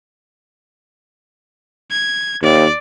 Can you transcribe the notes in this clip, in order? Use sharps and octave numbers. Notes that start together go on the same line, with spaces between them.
G#6
D#2 D5